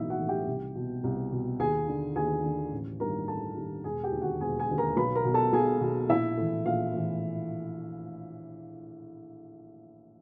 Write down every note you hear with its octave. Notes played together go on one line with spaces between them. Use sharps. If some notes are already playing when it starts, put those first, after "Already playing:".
Already playing: B1 A2 E3 D#4 E4 D#5 E5
F#4 F#5
A2 E3
G4 G5
C2
B2
C2
B2
D#2 G#4 G#5
D3
D#2 G#4 G#5
D3
A1
G2 D#3 A#4 A#5
A1 A4 A5
G2 D#3
E1 G#4 G#5
G4 G5
D#2 D3
F#4 F#5
E1 G#4 G#5
G#4 G#5
D#2 D3
A#4 A#5
B1 B4 B5
A#4 A#5
B2
A4 A5
B1 G#4 G#5
B2
A#1 E4 E5
A2 E3
A#1 F4 F5
A2 E3